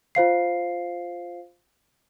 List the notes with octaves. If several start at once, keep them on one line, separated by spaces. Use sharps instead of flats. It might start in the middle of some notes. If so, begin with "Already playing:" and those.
F4 C5 F5 C7